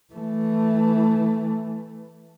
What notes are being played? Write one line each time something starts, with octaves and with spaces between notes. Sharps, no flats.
E3 A3